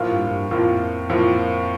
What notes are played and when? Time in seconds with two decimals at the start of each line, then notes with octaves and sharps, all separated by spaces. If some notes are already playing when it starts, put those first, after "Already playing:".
Already playing: A2 F3 A#3 F4
0.11 G2
0.31 G2
0.51 F2 A2 F3 A#3 F4
1.10 A2 F3 A#3 F4